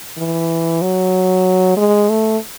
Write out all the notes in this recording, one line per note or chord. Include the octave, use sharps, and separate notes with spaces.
E3
F#3
G#3
A3